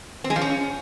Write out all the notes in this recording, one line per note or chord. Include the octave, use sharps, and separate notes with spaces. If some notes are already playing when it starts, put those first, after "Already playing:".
C4
G#3
F3
C#4